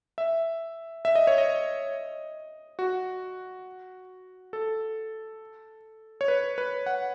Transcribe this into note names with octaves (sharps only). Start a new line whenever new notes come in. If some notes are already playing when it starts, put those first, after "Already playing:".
E5
E5
D#5
C#5
D#5
F#4
A4
C#5
B4
B4
F#5